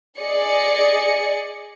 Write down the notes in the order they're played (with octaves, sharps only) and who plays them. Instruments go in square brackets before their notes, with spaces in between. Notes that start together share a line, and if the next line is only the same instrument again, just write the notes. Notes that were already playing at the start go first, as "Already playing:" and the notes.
[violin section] G#4 D5 D#5 C#7